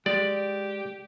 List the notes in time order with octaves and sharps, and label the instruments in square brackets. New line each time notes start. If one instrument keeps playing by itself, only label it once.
[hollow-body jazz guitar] G#3 [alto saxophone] G4 [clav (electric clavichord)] D5